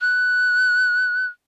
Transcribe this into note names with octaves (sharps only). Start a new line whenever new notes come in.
F#6